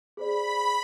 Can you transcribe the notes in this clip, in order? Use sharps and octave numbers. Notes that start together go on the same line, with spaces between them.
G#4 C5 D5 B5